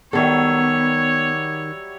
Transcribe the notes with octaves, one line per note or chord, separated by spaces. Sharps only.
D#3 F#3 G3 B3 A4 C#5 E5